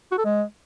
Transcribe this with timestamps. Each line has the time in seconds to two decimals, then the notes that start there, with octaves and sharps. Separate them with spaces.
0.11 F#4
0.18 A4
0.25 G#3